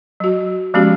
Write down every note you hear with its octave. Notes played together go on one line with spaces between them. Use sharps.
F#3 F#4
F3 G#3 B3 C#4 F#4 G4